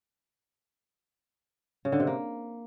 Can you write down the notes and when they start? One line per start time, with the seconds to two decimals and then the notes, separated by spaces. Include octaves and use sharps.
1.85 C#3
1.92 D3
2.00 C3
2.07 A#3